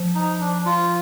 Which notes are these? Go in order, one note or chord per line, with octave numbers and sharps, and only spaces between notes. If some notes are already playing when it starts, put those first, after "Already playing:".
Already playing: F3
D#4
D4
F4